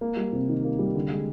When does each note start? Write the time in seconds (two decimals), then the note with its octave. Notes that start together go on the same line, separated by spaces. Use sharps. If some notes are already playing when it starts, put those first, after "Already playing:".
0.01 A#3
0.17 G3
0.33 C3
0.49 D#3
0.64 A#3
0.79 G3
0.95 D3
1.10 G#3